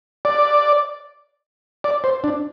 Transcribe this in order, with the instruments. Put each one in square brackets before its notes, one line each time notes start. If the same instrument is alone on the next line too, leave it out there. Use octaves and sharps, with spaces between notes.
[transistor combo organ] D5
D5
C5
D4